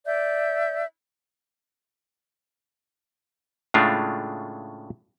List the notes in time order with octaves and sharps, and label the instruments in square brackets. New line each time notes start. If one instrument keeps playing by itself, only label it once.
[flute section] D5 E5 G6
[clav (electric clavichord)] A2 C#3 G#3 A3 D4 F4